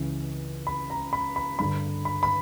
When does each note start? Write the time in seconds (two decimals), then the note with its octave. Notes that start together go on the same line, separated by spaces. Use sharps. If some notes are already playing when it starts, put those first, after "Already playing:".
Already playing: C#2 C#3 E3
0.67 B5
0.90 A#5
1.13 B5
1.36 B5
1.59 G2 D3 B5
2.05 B5
2.23 B5